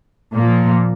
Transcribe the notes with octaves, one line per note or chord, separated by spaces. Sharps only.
A#2 F3 A#3